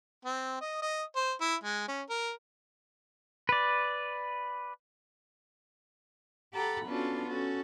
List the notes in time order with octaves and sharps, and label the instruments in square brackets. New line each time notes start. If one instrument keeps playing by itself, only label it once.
[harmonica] C4
D#5
D#5
C5
E4
G#3
C#4
A#4
[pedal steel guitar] B4 D5
[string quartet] G4 A4 F#5 A#5 B5
B3 C#4 D4 F4 F#4 A4
C#4 F#4 A4